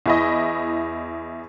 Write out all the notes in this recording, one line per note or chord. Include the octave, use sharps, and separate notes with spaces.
E2 E4 D#5